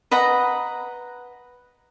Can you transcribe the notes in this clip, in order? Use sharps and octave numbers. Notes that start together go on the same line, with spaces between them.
B4 D#5 F#5 A#5